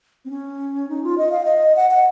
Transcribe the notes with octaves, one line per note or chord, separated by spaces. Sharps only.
C4
C#4
D#4
F4
D#5
F5
D#5
F#5
F#5